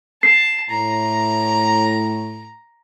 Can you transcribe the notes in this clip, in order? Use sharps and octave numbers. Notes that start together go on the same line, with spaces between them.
A5 C7
A2 A#5